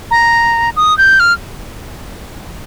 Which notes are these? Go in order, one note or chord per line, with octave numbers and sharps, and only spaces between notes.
A#5
D#6
G6
F6